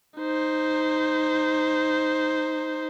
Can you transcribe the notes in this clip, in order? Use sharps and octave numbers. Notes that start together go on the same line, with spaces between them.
D#4 C5